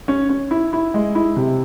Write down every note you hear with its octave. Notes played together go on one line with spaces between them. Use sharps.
C#4
C#4
E4
E4
G#3
E4
C3